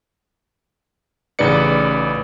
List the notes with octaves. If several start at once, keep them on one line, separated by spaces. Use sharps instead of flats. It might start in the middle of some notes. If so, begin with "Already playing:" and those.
A1 C#3 D#4 B4 D5 C#7